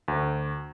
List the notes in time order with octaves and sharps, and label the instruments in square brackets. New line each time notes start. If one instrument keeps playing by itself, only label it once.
[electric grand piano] D2